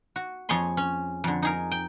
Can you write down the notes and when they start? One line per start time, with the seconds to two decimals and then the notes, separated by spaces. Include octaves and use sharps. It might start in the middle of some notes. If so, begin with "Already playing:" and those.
0.16 F#4
0.49 F2 G#4 C#5 G#5 C6
0.77 C#4
1.24 F2 D3
1.42 D#4 G#4 A#4
1.71 G5